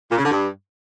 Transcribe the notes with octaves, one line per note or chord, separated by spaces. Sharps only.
A#2
C#3
D3
G2